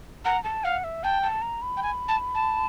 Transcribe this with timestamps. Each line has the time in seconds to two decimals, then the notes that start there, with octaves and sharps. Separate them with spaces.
0.25 F#5 A#5
0.44 A5
0.64 F5 F#5
0.84 E5
1.03 G5 A5
1.23 A5
1.42 A#5
1.62 B5
1.76 G5
1.82 G#5
2.08 A5
2.34 A5